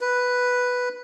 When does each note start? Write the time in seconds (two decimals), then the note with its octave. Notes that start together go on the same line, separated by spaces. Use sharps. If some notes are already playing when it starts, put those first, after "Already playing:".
0.01 B4